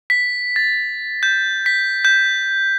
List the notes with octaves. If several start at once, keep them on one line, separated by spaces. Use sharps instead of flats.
B6
A6
G6
B6
G6